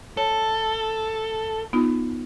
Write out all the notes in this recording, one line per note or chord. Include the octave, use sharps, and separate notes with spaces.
A4 C#5
B3 D#4 F4